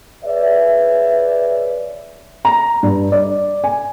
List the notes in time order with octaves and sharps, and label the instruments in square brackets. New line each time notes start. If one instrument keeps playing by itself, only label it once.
[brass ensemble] G#4 B4 C#5 D5 E5
[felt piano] A#5
G2
D5
G#5